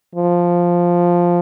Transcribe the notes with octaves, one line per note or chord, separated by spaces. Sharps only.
F3